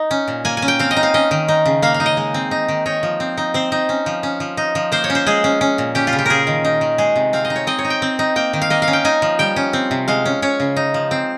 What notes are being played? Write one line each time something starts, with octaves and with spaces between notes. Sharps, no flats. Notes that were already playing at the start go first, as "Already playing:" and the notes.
Already playing: D#4
C#4
A#2
A#3 G#5
G#5
C#4
G5
C4 F5
D#5
D#4
F5
C#4 D#5
D#3
D#4
C#3
A#3 F5
F5
D#4
D#5
G#3
C4
D#4
D#3
D#4 C#5
F3
C4
D#4
C4 C5
D#4
C#4
F3
C#4
F3
D#4
F3
A#3 C5
C#5
C#4
C5
G#3 G#4
C#4
C#4
A#2
C#4 G4
F4
C#3
G4
C#4 G#4 A#4
D#3
D#4
D#3
G#3 G#4
C3
C4 F5
D#5
D#4
C#5
C4 D#5
C#5
D#4
G5
C4
D#4
A#3 G5
D#3
F5
A#3 D#5
F5
C#4
G5
D#4 G#5
F3
G3 G5
C#4
C4
C3
G#3 F5
C#4
C#4 C#5
C#3
D#4
F3
C4